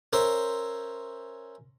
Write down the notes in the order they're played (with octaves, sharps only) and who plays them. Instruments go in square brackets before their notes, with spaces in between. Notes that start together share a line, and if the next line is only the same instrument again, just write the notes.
[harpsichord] C#4 A#4 C5 E5 C6